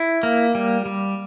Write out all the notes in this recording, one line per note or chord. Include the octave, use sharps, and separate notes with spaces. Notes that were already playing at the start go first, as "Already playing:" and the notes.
Already playing: E4
A#3
G3
G3